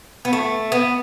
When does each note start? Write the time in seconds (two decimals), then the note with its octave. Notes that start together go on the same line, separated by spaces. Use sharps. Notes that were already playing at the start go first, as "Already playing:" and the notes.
0.25 B3
0.33 A3
0.72 B3